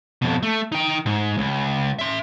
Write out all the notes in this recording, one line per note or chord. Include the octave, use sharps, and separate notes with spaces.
F2 B2
A3
D#4 G5
G#2
C#2
E5 C6